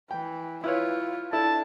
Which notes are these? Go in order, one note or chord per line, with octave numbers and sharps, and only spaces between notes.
E3 G5
E4 F4 B4 C#5
D4 E4 A4 A5